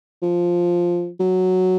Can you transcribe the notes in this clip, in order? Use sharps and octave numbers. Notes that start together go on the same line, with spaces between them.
F3
F#3